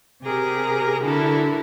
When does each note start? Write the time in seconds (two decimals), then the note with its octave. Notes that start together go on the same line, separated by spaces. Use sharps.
0.22 C3 G4 G#4 A#4 A#6
1.01 D3 E4 F#4 A4 A#4